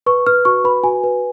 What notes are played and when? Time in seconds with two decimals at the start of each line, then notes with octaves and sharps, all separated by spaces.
0.06 B4 C#6
0.27 B4 F6
0.45 F#4 C#6
0.64 B4 B5
0.84 F#4 G#5
1.04 B4